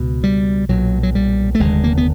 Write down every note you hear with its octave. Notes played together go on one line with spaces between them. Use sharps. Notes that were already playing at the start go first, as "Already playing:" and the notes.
Already playing: C#2 B2
G3
B1 A#2 F#3
F#3
G3
A3
F1 D#2 D3 G#3
A#3
B3